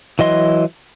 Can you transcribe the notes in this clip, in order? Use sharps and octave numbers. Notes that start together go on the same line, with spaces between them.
E3 F#3 D#5 C6